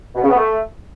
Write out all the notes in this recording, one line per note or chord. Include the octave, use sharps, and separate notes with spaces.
B2
C#3
B3
A3